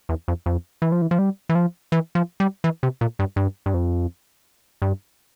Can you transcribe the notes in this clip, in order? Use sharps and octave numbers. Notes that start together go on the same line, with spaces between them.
E2
F2
F2
E3
F3
E3
F3
G3
E3
F3
E3
F3
G3
E3
C3
A#2
G2
G2
G2
F2
G2